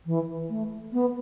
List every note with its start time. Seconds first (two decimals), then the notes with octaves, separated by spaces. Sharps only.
0.06 E3
0.49 A3
0.93 B3